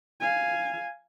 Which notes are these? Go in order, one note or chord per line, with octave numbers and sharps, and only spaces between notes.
F5 G#5